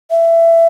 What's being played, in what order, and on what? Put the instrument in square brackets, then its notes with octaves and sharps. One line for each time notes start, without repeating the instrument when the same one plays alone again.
[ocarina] E5